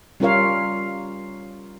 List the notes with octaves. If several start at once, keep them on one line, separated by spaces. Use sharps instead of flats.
G3 C#4 F4 A#4 C#5 F5